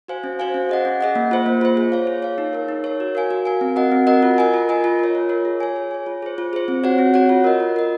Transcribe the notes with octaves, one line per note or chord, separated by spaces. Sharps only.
F#4 C5 F5 G#5
C#4
F#4 C5 F5 G#5
C#4
G#4 D#5 F#5
C#4
G#4 D#5 F#5
A#3
F4 C5
A#3
F4 C5
G#4
C#5 F5
G#4
C#5 F5
D#4
A#4 C#5
D#4
A#4 C#5
F#4
A#4 F5 G#5
F#4
A#4 F5 G#5
C4
F#4 A#4 D#5 F#5
C4
F#4 A#4 D#5 F#5
F4
A#4 D#5 G#5
F4
A#4 D#5 G#5
F4
A#4 C#5
F4
A#4 C#5
G#4
C#5 G#5
G#4
C#5 G#5
F4
G#4 C5
F4
G#4 C5
C4
F#4 C#5 F#5
C4
F#4 C#5 F#5
F4
A#4 D#5
F4
A#4 D#5